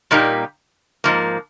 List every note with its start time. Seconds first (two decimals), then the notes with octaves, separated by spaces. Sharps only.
0.11 A#2 G3 A#3 D#4 G4
1.04 G#2 F3 A#3